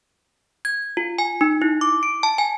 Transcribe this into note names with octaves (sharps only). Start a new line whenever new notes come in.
G#6
F4
G#5
D#4
E4
D6
D7
A5
G#5